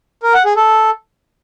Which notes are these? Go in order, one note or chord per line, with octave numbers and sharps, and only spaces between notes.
A#4
F#5
G#4
A4